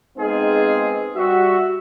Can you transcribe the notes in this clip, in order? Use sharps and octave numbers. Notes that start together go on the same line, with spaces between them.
G#3 B3 C4 D#4 F4 G#4
G3 F#4 E5